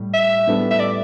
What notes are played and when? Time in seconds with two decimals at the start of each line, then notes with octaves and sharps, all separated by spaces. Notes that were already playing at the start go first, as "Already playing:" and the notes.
Already playing: A2 G3
0.13 E5
0.47 A2 G3 B3 D4 A4
0.71 E5
0.79 D5